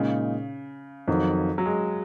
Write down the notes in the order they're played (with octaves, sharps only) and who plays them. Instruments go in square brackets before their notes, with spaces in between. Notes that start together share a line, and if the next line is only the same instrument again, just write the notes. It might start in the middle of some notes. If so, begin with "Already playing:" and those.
Already playing: [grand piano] A#2 G#3 D#4 [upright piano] C#3
[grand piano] F2 D#3 F#3
[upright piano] F#3
G#3